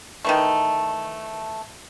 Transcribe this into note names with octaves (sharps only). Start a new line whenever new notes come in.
D#3 E3 A3